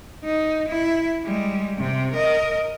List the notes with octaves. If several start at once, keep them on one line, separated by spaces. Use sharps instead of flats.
D#4
E4
G3 G#3
C3 C4
A#4 D#5